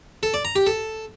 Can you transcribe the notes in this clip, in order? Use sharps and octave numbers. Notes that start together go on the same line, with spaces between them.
A4
D5
A#5
G4
A4